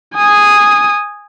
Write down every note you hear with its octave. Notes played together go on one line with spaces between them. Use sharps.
G#5 D#6